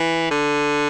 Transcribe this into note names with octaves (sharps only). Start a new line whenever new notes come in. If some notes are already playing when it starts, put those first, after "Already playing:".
Already playing: E3
D3